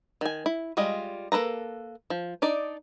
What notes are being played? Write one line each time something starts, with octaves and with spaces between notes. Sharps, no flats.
D#3 G#5
E4
G3 G#3 F4 D#5
A#3 A4 B4 A#5
F3
D4 D#4 D5